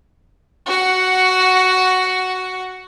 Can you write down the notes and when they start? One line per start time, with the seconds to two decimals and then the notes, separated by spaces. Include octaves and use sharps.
0.66 F#4 F#5